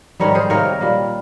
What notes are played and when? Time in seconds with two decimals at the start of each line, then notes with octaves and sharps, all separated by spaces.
0.20 G#2 D#3 G3 A#4 C#5
0.35 G#4 C5
0.50 C3 D#3 A#3 A#4 C#5
0.81 A#2 G3 A#3